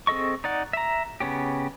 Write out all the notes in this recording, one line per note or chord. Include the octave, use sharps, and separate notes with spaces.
C4 G#4 A4 D#5 C#6
D#4 D5 F#5
E5 A#5
C#3 B3 C#4 G4